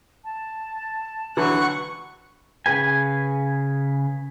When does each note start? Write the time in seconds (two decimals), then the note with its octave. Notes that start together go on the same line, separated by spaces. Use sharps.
0.24 A5
1.37 D3 E3 F#3 F#5 C#6
2.66 C#3 G#4 B4 G#5